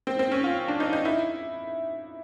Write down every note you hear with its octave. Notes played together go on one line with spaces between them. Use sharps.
C4
C4
C#4
F4
D4
D#4
D#4
E4